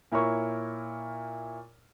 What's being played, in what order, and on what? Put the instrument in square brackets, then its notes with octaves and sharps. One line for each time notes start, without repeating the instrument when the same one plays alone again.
[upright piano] A#2 E4 A#4 C#5 C#6